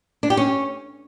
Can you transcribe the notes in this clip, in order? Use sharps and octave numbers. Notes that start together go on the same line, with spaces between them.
D4
G4
C#4